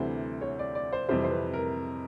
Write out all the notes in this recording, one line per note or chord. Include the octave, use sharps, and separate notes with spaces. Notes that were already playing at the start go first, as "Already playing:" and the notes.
Already playing: D2 C3 E3 G3 C5
C#5
D5
D5
C5
F2 C3 E3 G3 C5
C5
B4
A#4